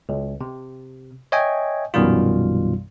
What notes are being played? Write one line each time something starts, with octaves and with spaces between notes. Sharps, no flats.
C#2
C3
C#5 D#5 E5 G5 G#5
A#1 F#2 B2 D#3 G3 F4